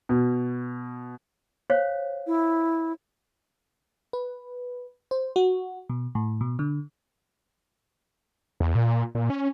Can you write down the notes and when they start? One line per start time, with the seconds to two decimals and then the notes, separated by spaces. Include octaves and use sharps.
0.09 B2
1.70 C5 C#5 F5
2.26 E4
4.13 B4
5.11 C5
5.36 F#4
5.90 B2
6.15 A2
6.41 B2
6.59 D3
8.60 E2
8.75 A#2
9.15 A#2
9.30 C#4